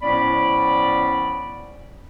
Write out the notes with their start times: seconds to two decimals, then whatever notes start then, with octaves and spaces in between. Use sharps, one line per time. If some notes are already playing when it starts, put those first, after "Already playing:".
0.02 A2 F3 B3 C#4 D5 B5